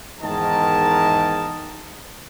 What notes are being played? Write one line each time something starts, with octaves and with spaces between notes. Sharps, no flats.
E2 G#2 D#3 A#4 D#5 A5